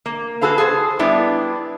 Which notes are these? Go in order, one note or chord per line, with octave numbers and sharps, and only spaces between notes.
A#3
F#4 G#4 A4 B4 F5
G#4 A4 C5
G3 B3 D4 E4 D5